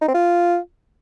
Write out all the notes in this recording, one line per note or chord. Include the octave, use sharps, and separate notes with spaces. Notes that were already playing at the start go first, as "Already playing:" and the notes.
D#4
C4
F4